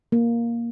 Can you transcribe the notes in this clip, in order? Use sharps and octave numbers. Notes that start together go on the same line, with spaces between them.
A#3